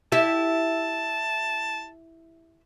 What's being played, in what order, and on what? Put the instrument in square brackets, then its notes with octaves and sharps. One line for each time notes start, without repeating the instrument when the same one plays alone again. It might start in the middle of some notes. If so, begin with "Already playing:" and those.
[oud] E4 G4 E5 [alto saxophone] A5